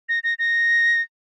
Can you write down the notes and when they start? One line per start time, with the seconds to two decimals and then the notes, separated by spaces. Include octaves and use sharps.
0.09 A#6
0.24 A#6
0.39 A#6